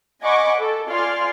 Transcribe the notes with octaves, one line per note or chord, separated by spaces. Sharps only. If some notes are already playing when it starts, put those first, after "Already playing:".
D#5 F#5 G#5 B5 C#6 D6
A4
F4 D5 G#5 C6 F6